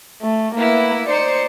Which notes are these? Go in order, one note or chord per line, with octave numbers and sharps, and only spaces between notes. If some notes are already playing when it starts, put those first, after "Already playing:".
A3
A#3 B3 E4
D#4 C5 D5 C#7